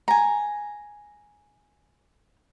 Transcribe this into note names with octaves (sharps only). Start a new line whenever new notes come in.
G#5 A#5